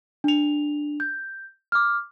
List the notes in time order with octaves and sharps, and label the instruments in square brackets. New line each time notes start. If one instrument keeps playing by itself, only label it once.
[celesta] D4 F7
G6
D6 F6